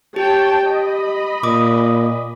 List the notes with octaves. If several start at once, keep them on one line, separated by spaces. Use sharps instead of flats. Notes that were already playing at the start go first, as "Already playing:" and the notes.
G4 C#5 G5 A5
D#5 B5
A#2 D6 D#6